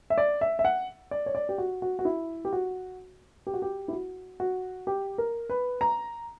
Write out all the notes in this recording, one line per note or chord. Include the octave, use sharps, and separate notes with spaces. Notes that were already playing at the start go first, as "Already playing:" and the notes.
E5
D5
E5
E5
F#5
D5
C#5
D5
G4
F#4
F#4
F#4
E4
G4
F#4
G4
F#4
G4
E4
F#4
F#4
G4
A#4
B4
A#5